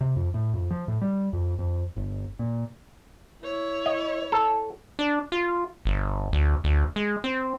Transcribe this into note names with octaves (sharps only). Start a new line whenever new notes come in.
C3
F2
A2
F2
F3
A2
G3
F2
F2
G1
A#2
E4 C#5
D#5
A4
D4
F4
G1
D2
D2
G#3
C4